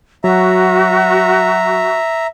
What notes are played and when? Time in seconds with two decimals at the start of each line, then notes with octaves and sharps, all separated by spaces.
0.24 F#3 F#4 E5 A#5